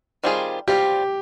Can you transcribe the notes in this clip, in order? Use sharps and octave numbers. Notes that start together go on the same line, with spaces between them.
D#3 G3 C4 F4 G#4
G3 C4 F4 G4